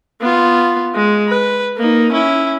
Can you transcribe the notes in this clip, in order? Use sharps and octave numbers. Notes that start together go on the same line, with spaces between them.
B3 F4
G#3
B4
A#3 D#4
C#4 E4